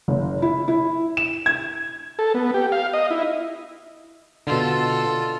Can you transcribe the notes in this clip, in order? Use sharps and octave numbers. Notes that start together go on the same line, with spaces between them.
F#1
E4
E4
E7
G#6
A4
B3
G4
F5
D#5
E4
B2 D3 F4 A4